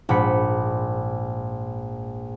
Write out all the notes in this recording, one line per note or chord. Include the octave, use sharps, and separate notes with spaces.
A#1 G#2 B5 C#7